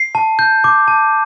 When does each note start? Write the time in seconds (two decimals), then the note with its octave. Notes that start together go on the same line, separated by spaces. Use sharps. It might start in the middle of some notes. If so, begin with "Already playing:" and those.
Already playing: C7
0.15 A5
0.39 G6
0.64 D6
0.88 A5